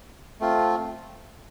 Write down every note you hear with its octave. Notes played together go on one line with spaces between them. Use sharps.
A3 C4 F4